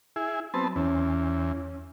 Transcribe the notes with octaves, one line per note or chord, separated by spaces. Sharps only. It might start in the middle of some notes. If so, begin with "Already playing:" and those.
E4 G#4
F#3 B3 C4 A5
E2 C#4